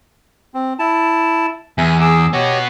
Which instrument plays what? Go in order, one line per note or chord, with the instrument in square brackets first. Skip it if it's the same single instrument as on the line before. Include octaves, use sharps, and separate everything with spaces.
[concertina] C4
E4 A5
[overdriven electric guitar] E2 [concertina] E5 G#5
[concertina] G#4 D6 E6
[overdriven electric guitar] B3 F#4 [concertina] G4 C#5 D#5